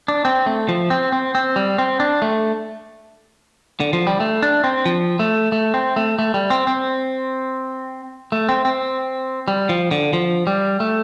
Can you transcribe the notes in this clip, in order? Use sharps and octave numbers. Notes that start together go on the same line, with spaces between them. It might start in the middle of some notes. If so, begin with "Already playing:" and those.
D4
C4
A3
F3
C4
C4
C4
G3
C4
D4
A3
D3
F3
G3
A3
D4
C4
F3
A3
A3
C4
A3
A3
G3
C4
C4
A3
C4
C4
G3
F3
D3
F3
G3
A3